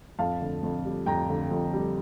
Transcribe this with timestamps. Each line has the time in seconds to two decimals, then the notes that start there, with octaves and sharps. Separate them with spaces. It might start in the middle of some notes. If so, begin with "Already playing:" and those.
0.19 F2 F5 A5
0.41 D3
0.63 F2
0.85 G3
1.06 F2 G5 A#5
1.29 D3
1.51 F2
1.73 G3